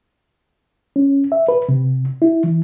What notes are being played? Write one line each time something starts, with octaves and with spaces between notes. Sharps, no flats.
C#4
E5
B4
C3
E4
E3